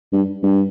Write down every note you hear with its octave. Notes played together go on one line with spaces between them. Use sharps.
G2
G2